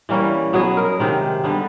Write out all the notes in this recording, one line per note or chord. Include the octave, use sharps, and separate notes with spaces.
E3 G3 A#3 C#4
B2 F#3 B3 G#4
A#4
C3 D#3 G#3
D3 G3 B3 D4